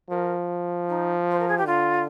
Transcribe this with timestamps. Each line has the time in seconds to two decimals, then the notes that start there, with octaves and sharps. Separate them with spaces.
0.10 F3 A#4
0.89 D#4
1.31 C5
1.39 A#4
1.48 G#4
1.57 G4
1.66 D3 F4